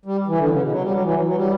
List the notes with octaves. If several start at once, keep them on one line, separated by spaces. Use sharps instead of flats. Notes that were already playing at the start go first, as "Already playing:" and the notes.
G3
E3
D3
C#3
B2
F#3
G3
F#3
E3
F#3
F#3
G3